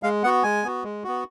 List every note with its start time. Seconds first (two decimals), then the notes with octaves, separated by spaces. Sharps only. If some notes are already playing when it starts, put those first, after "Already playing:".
0.03 G#3 F5
0.23 B3 F#4 F#5
0.43 G#3 G#5
0.63 B3 F#4
0.83 G#3
1.04 B3 F#4